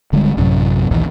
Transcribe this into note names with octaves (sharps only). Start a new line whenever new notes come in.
D1 D3 G3 G#3
A1 F#2 C3 F#3
A#1 D#2 A#2 E3